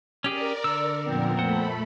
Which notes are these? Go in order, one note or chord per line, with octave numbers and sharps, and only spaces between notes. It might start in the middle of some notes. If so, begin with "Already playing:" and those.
C#4 G4 G#4 A#4 D5
D3 E6
F2 A#2 B3 C4 A#4
A3 A4 C5 F#5 B5